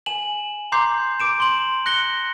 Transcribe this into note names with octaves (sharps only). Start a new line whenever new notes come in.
G#5 E7 F#7
A#5 C6 D6 G6 C7
D6 D7 E7
C6 F#7
F#6 A#6 C#7 G7